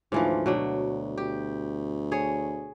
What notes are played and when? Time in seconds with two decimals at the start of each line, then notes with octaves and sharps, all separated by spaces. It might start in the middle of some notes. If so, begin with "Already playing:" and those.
0.12 D2 G#2 E3 F3
0.46 B2 F#3 D4
1.18 G4
2.12 G#4 C#5